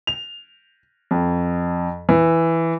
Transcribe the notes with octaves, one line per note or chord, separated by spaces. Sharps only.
F7
F2
E3